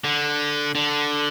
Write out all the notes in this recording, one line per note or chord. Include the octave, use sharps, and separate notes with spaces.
D3
D3